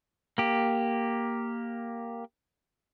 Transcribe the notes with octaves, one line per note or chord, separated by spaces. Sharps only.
A#3 G4